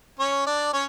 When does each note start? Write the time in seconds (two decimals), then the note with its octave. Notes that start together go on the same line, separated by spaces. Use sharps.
0.19 C#4 C#5
0.46 D4 D5
0.73 C#4 C#5